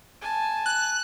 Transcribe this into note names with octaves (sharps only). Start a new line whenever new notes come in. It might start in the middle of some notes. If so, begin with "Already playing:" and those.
G#5 A5
F#6